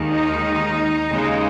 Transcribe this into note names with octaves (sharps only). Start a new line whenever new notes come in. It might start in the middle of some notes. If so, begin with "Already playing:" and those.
Already playing: D#2 D#3 G#3
D#4
D#2 C#3 G#3